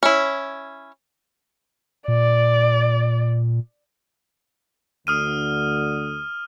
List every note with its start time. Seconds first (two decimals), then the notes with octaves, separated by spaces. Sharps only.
0.03 C#4 E4
2.08 A#2 D5
5.07 D2 D3 D#6 F6 D#7